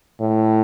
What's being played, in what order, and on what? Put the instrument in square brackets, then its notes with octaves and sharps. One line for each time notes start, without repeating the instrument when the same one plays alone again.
[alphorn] A2